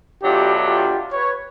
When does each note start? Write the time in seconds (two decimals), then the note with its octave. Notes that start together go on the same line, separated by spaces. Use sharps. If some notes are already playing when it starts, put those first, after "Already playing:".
0.23 B2 F#3 A3 D4 F4 G4
0.68 F4 G4
1.12 B4 C#5